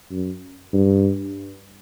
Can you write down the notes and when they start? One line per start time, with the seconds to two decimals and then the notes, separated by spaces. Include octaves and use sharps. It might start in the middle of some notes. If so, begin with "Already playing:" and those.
0.11 F#2
0.73 G2